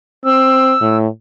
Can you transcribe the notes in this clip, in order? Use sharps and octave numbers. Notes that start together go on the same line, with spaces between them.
C4 E6
A2